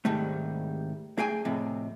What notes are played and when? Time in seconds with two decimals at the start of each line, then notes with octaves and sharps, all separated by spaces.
0.05 C2 G#2 D#3 G3 A3
1.18 A3 G#4 G5 G#5
1.45 F2 A2 C3